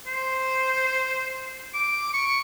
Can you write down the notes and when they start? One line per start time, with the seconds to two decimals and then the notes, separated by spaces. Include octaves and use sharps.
0.07 C5
1.74 D6
2.14 C#6